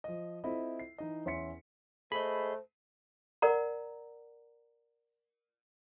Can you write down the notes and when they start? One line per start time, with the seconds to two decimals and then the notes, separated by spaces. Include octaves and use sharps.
0.04 F3 D#5
0.44 C4 E4 F4 A4 D#5 B5
0.79 C7
0.98 E3 D#4 D#5
1.25 E2 C#4 E5 C6 B6 C#7
2.12 A3 G#4 C5 D#5 B5
3.42 A#4 D5 F#5 A#5